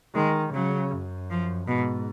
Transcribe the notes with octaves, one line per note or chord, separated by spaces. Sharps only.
D#3 G#3
C#3 F#3
F#2
F3
G#2 B2